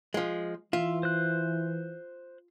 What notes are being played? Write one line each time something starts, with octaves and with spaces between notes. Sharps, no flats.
F3 G#3
E3 F4 E5
C5 F#6